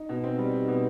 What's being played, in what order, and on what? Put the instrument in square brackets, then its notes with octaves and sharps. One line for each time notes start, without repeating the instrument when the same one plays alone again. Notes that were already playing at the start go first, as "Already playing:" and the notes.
Already playing: [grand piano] D#4
B2
C4
G3
D#4
B2